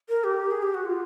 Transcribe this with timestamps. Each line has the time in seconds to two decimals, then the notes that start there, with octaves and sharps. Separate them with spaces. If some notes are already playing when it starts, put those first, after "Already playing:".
0.09 A#4
0.24 G4
0.51 G#4
0.63 G4
0.74 F#4
0.85 F4